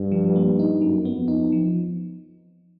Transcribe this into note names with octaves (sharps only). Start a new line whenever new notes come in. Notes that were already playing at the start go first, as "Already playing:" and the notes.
Already playing: G2
F3
A#3
D#4
F#2 F#3
B3
F2
D#4
F3